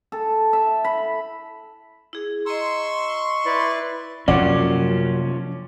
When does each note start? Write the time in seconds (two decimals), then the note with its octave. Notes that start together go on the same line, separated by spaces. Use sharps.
0.12 A4
0.53 E5
0.85 B5
2.13 E4 G#4
2.46 D#5 A#5 C6 C#6 E6
3.46 E4 B4 D5
4.28 F#2 C3 F3 A#3 C#4 D5 F#5